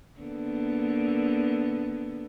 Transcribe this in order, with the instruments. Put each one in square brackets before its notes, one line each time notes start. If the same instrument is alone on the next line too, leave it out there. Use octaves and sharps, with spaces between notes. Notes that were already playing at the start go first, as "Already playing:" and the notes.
[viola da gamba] D3 A#3 B3